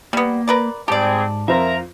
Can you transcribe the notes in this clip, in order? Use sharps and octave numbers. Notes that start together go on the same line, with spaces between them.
G3 A#3 B3
A#4 B4 D5
G#2 G3 C4 G4 G#4 D5 A5
F2 F4 A#4 C5 E5 A#5